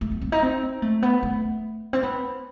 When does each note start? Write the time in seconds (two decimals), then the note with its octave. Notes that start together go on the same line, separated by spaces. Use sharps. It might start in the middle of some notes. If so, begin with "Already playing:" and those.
0.01 A3
0.12 B3
0.21 C4
0.32 D#4
0.42 C4
0.82 A3
1.02 B3
1.23 A3
1.93 C4
2.03 B3